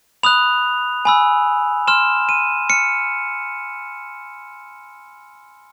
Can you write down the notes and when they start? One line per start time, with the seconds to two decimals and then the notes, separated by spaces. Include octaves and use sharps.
0.23 B5 D#6 F#6 F7
1.05 G#5 B5 E6
1.87 C6 F6 E7
2.29 D#7
2.70 F6 C#7